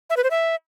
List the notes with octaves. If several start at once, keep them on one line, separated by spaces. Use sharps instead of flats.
E5
B4
C5
E5